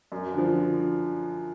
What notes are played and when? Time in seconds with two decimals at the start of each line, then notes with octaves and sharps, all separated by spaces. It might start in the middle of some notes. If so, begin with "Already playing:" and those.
0.12 F#2
0.34 D3 F3